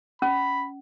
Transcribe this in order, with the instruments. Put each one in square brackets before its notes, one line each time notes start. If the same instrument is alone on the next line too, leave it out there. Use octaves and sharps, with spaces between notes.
[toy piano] C#4 [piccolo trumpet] B5